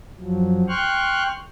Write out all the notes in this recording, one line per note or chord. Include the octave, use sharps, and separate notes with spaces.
F#2 F3 F#3
G5 C6 C#6 F6 F#6